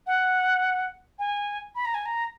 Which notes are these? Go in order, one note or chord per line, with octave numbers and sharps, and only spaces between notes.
F#5
G#5
B5
A#5
G#5
A#5